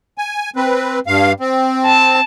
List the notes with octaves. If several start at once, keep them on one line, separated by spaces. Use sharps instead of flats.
G#5
C4 B4
G2 F5
C4
A5